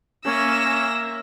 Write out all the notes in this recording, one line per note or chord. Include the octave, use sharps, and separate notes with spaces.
A#3 C#4 E5 E6 A#6